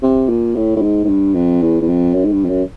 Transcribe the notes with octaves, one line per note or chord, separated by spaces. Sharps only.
C3
A#2
A2
A2
G#2
G#2
G2
F2
E2
E2
F2
F#2
G#2
G2
F2
F#2